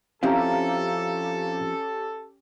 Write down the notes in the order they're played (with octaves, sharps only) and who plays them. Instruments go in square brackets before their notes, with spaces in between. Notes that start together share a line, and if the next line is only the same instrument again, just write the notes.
[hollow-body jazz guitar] F3 C4 E4 [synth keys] C#4 G4 [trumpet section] A4 [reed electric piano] F5 A#5